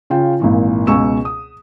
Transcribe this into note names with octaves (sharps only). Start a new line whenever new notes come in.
C#3 F4 G5
G#1 A#2 E3
C#2 B2 G#5 C#6 E6 E7
D#6